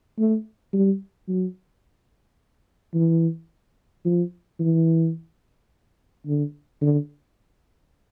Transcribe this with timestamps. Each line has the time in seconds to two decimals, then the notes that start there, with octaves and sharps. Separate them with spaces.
0.19 A3
0.73 G3
1.28 F#3
2.94 E3
4.05 F3
4.60 E3
6.26 D3
6.81 D3